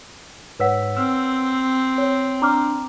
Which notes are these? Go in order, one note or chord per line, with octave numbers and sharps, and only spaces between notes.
G#2 B4 C#5 F#5 E6 B6
C4 E6 F6
C#5
D4 A#5 D6 F6